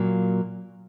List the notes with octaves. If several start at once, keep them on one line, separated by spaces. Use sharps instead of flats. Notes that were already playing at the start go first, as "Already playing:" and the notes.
Already playing: A#2 F#3 A#3